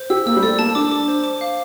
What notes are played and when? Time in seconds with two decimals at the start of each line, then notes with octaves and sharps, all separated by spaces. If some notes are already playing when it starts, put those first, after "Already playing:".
Already playing: C5
0.10 G4 E6
0.26 A#3 E6
0.37 G3
0.42 A3 D5
0.59 A#3 A5
0.75 D4 D6
0.91 D6
1.08 C5
1.24 D6
1.41 F5